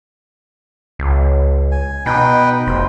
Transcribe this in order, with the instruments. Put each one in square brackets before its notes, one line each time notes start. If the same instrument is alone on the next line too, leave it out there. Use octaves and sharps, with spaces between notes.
[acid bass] C#2
[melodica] G#5
[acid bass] B2 [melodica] D#4 B4 G5
[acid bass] F1 [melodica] C5